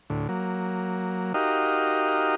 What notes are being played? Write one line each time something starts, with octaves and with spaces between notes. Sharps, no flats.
D2 A2
F#3 A#3
D#4 F#4 G4 A#4 D#5 F5